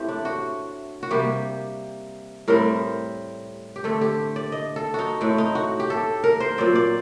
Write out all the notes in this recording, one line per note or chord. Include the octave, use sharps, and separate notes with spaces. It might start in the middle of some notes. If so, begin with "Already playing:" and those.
Already playing: A2 A3 C4 G4
D4
F#4
F#4
C3 G3 A#3 G4
A2 G3 C4 A#4
G4
D3 A3 C4 A4
G4
D5
D#5
A4
D#4 F#4
A2 A3 C4
D#4
F#4
G4
A4
A#4
C5
A#2 F#3 C4 D5
D5